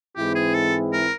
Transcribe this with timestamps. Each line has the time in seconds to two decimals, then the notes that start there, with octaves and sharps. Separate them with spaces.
0.16 G#2 E3 G#3 C4 E4 G4
0.35 G#4
0.54 A4
0.93 A#4